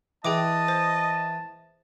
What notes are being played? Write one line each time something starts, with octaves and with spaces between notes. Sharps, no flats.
E3 G#4 D#5 G5 A5 D6
C5